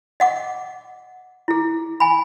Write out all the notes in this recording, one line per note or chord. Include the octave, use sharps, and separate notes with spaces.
D#5 F#5 D6
E4 G#4
G#5 B5